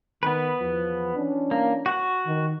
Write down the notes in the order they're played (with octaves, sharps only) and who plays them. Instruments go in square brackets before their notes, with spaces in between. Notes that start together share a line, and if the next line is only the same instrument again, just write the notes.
[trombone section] D#3 [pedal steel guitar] B3 B4
[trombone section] E2 F3
E3 C#4 D4
[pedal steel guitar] A#3
F#4 F#5
[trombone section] D#3